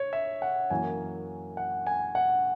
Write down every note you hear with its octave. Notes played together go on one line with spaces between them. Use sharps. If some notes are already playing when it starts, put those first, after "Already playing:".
Already playing: C#5
E5
F#5
F#2 E3 A#3 G#5
F#5
G#5
F#5